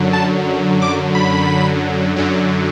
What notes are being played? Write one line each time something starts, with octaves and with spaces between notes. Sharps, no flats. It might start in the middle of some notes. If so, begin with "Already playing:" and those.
Already playing: F#2 D3 F#3
A5
D6
B5
F#2 D3 F#3